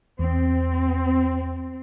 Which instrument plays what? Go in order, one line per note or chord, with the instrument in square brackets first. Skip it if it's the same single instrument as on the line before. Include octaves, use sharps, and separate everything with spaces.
[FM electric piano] E2 [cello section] C4